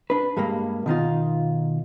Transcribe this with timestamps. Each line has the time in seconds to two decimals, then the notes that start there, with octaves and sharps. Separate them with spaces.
0.10 D4 B4
0.37 G2 G3 G#3 A#3
0.86 B2 D#3 D#4 F4